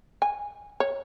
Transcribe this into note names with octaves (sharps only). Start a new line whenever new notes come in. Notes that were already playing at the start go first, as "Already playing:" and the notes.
G#5
C#5